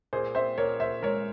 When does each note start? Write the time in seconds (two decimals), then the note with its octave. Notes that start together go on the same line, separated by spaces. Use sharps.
0.13 A#2 G#4 C5
0.35 C4 C5 E5
0.57 A#2 A#4 C#5
0.80 A#2 C5 E5
1.03 G#3 A#4 C#5